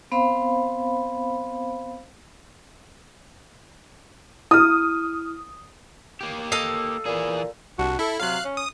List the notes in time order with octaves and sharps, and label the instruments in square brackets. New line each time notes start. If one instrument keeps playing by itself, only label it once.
[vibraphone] B3 C4 C5 F5 B5
[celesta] E4 F6 [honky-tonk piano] D#6
[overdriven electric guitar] A#3 G4
[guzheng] A4 D#5 F5
[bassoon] A#2 [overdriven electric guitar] E3 G#4
[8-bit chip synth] C2 [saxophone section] D4 F#4
[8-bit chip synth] E4 [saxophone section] A4
[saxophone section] C3 F#3 [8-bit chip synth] F5 F#6
[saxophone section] C#4
[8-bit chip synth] D#6